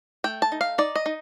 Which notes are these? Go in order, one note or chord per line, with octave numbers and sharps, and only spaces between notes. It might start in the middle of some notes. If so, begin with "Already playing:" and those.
A3 G5
A5
D#4
F5
D#4 D5
D#5
D#4